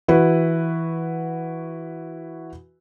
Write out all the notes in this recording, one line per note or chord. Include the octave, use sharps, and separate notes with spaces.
E3 E4 F#4 B4